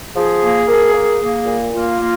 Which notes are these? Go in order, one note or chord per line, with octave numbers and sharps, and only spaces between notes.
F3 G#4
A#3
A#3
A#3
A#3
A#2
A#3 F4
A#3